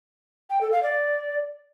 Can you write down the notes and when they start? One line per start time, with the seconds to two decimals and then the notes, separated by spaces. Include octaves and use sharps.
0.50 G5
0.61 A4
0.72 F5
0.83 D5